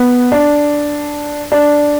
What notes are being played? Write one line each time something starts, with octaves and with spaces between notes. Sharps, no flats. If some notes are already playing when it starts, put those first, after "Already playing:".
Already playing: B3
D4
D4